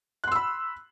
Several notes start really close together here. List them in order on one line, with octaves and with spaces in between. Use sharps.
F#6 C6 E6 B5